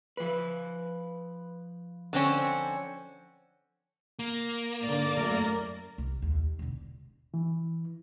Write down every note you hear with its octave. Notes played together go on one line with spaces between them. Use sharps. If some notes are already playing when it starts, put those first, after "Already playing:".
F3 B4
D3 C4 C#4
A#3
G#2 D3 D5
F#2 A3 A#4
C2
D#2
E1 D3
E3